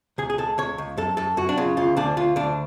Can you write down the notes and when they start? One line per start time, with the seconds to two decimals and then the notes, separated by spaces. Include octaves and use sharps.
0.18 C#2 G#4
0.30 G#4
0.38 C#2 A4
0.58 C#2 C#5
0.78 C#2
0.97 F#2 A4
1.17 F#2 A4
1.37 F#2 F#4
1.49 D4
1.57 C#3 F4
1.77 D2 F4
1.97 D2 D4
2.17 D2 F4
2.36 D2 D4